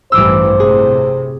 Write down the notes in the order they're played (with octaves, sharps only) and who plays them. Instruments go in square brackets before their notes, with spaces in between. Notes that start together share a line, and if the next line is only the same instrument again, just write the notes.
[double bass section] A1 G2 E3 [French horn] C5 [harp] D6 E6
[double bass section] A2 C3 [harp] G#4